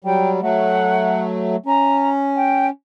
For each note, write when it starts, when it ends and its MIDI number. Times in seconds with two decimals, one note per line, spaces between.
0.04 0.41 54
0.04 0.41 55
0.04 0.29 79
0.42 1.56 54
0.42 1.56 57
0.42 1.21 78
1.66 2.70 61
1.66 2.09 82
2.36 2.66 79